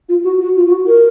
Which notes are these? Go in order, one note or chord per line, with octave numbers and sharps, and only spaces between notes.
F4
F#4
F#4
F4
F4
F#4
A#4